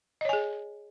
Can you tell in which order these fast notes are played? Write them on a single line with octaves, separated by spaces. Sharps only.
D#5 C#5 G#5 G#4